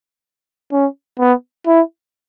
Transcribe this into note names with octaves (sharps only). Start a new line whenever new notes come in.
C#4
B3
E4